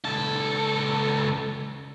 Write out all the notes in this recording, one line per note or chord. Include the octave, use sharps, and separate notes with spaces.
C#2 A4